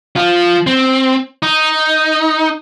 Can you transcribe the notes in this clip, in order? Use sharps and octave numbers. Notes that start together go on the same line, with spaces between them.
F3 F4
C4
D#4